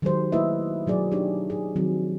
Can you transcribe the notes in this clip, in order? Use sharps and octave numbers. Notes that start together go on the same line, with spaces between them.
D#3 F#3 G#3 G4 A4 C5
A3 A#3 E4 B4 D#5 E5
B2 F#3 G#4 D5
D4 D#4 G4 C#5
D#4 G#4
D#3 F3 F#3 C4